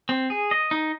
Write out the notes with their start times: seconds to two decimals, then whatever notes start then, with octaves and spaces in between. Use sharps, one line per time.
0.09 C4
0.30 G#4
0.51 D#5
0.71 D#4